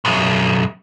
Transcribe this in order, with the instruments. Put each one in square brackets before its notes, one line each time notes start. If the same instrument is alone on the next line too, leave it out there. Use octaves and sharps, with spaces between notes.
[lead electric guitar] B1 F#2